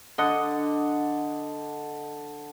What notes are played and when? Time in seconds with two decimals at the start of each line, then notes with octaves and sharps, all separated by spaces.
0.18 D3 D#5 F#5